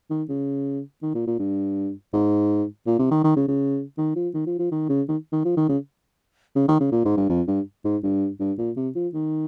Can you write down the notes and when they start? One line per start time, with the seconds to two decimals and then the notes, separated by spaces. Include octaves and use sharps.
0.10 D#3
0.29 C#3
1.02 D#3
1.14 A#2
1.27 A#2
1.39 G2
2.13 G#2
2.87 A#2
2.99 C3
3.11 D#3
3.24 D#3
3.36 C#3
3.48 C#3
3.98 D#3
4.16 F3
4.34 D#3
4.47 F3
4.59 F3
4.71 D#3
4.89 C#3
5.08 D#3
5.32 D#3
5.45 F3
5.57 D#3
5.69 C#3
6.56 C#3
6.68 D#3
6.80 C#3
6.92 A#2
7.05 G#2
7.17 G2
7.29 F2
7.47 G2
7.84 G#2
8.03 G2
8.40 G2
8.58 A#2
8.76 C3
8.95 F3
9.13 D#3